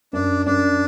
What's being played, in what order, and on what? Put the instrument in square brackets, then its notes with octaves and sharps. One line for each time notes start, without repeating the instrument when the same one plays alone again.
[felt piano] F#2 [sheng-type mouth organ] D4
[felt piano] F#2 [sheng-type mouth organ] D4